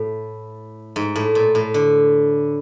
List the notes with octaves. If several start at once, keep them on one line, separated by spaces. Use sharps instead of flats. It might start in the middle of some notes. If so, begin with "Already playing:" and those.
Already playing: A2
G#2
A2
A#2
A2
D3